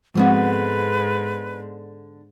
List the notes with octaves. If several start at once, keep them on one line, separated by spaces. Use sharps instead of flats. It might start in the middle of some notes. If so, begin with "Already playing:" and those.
G#2 D3 F3 G#3 B3 C4 F#4 B4